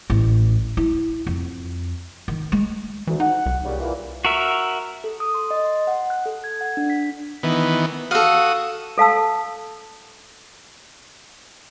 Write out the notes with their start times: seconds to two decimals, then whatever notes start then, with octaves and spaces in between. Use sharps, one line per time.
0.10 A1
0.77 E4
1.27 F2
2.28 D#3
2.52 G#3
3.07 D2 E3
3.20 D#4 F#5
3.46 C2
3.65 A#2 C#3 G3
3.80 A#2 E3 A#3
4.25 F#4 A#4 E5
5.04 A4
5.20 D#6
5.34 C6
5.51 D#5
5.65 C6
5.87 F#5
6.10 F#6
6.26 A4
6.44 G#6
6.61 F#5
6.77 D4
6.90 B6
7.43 D#3 E3 B3
8.11 F#4 A4 F5 D#6
8.98 A4 F5 A5 E6